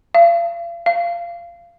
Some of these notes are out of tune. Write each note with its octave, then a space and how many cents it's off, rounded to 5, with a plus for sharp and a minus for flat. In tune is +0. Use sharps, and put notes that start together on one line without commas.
F5 -40
F5 -20